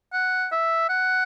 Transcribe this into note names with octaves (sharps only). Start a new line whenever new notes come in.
F#5
E5
F#5